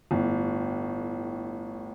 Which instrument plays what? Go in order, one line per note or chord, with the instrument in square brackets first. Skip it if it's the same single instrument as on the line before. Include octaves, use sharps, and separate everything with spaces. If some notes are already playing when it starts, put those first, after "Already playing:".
[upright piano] G1 A2